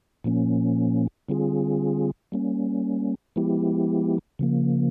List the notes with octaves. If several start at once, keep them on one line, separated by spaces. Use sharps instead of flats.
A#2 F3 A#3 C#4
D3 G3 C4 F4 G#4
G3 A#3 C#4
F3 G#3 B3 E4 G4
C#3 F3 A#3